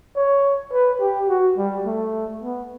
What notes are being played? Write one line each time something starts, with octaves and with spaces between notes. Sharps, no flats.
C#5
B4
G4
F#4
G3
A3
B3